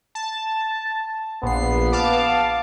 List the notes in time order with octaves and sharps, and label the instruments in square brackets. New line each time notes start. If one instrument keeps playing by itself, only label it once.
[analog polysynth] A5
[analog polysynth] A#1 C7 [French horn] B3
[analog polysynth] F5 A5 D6